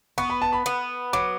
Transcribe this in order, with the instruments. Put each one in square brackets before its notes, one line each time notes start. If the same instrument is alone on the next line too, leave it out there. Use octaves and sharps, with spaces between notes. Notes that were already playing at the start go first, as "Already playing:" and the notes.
[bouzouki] B3 [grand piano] C#6
[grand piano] B5
A5
B5
[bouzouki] B3
[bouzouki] F#3 [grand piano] D6